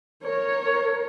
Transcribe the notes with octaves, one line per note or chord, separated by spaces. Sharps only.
A#4 C#5